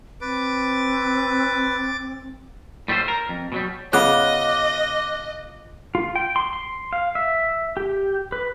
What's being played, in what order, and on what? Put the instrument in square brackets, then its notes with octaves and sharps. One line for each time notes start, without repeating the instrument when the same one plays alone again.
[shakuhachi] C4 [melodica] B4 [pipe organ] D6 A6
[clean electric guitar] A2 G3 A3 F4 C5
A#4
F2
B2 F#3 G3
[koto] C#3 B3 [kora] F4 [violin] D#5 [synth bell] D6 F#6
[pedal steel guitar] F4
G5
C6
C6
F5
E5
G4
B4